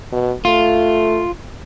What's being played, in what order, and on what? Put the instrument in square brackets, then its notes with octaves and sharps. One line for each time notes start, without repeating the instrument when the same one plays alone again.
[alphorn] B2
[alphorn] A3 [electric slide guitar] F4